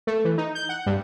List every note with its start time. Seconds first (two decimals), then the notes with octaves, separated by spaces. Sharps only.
0.07 A3
0.25 E3
0.38 D#4
0.55 G6
0.69 F#5
0.86 G2